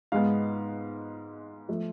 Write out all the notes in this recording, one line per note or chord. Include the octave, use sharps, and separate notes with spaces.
G#2 G#3 B3 F5
F3 A3